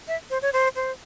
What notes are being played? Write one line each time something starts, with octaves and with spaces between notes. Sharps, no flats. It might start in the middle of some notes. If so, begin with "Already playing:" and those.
E5
C5
C#5
C5
C5